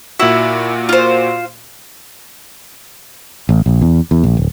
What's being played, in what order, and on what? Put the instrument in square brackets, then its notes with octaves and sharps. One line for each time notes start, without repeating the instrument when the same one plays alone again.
[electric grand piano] A#2 F#4 [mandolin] E4
[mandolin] F4 C5
[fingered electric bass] A1
A#1
E2
E2
A#1
D1